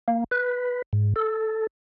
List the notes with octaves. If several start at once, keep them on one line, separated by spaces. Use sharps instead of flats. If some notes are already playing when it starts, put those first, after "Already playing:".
A#3
B4
G#2
A4